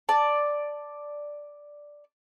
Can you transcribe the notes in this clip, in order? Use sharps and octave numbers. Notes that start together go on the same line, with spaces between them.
D5 A5